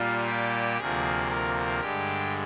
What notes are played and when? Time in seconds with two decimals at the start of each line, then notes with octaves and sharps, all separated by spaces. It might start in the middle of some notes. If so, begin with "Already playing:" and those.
Already playing: A#2 G3 A#3 F4
0.26 G4
0.78 D2 C3 F3 A#3 G#4
1.30 A#4
1.80 G2 D3 G#3 G4